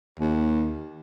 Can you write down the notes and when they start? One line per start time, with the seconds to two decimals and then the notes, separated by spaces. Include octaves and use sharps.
0.19 D#2